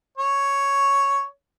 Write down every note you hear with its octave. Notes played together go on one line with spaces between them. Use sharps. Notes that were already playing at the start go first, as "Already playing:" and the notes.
C#5